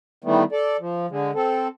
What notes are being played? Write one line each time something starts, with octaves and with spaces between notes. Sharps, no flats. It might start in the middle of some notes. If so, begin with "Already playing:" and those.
D#3 E3 G3 A3 B3
A4 D5
F3
D3 G#3
C4 A4